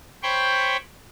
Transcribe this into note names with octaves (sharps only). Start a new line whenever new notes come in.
C5 C#5 G5 B5 C#6